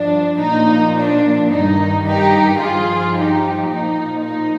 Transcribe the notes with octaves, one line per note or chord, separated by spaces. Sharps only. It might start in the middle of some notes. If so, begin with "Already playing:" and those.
Already playing: G2 F3 D4
A#2 F3 D#4
D4
G2 D#3 D#4
D#4 G4
G2 F3 F4 G#4
D#4 G4
A#2 F3 D#4
D#4